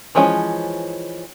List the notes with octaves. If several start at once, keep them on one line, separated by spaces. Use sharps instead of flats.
E3 F3 G#3 C#4